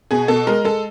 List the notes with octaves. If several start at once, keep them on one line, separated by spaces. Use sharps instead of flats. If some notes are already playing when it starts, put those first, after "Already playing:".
B2 G#4
B2 A4
G#3 A#4
G#3 A4